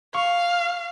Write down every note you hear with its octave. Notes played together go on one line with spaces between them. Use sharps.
F5 C#6